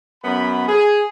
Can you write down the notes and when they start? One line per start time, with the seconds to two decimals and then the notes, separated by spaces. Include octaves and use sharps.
0.23 F#2 B3 B5
0.68 G#4